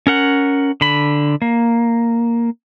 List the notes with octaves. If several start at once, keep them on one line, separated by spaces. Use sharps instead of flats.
C#4 A#4 F#5
D3 B5
A#3